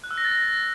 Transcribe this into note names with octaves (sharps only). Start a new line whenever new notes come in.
F#6
E6
A#6
A6
A#6